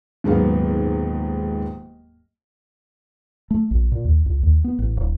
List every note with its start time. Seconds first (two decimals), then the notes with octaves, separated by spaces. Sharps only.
0.24 D#1 G#2 F#3 B3 F5
3.51 A3
3.71 A#1
3.92 A#2
4.05 D#2
4.26 C#2
4.43 D#2
4.64 B3
4.79 A1
4.97 D1